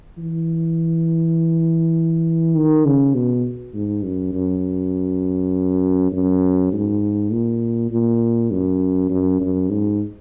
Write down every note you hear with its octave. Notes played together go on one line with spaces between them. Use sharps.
E3
D#3
C#3
B2
G#2
F#2
F#2
F#2
G#2
A#2
A#2
F#2
F#2
F#2
G#2